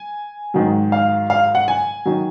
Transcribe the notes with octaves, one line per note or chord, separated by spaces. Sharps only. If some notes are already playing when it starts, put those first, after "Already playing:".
Already playing: G#5
G#2 D#3 F#3
F5
F5
F#5
G#5
D#3 F#3